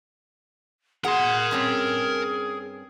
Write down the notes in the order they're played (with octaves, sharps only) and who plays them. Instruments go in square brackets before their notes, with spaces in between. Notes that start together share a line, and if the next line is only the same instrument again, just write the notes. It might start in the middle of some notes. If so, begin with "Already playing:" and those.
[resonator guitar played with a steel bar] B2 F#5 [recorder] G#4 [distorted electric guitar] A#4 C6
[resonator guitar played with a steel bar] G2 C4 C#4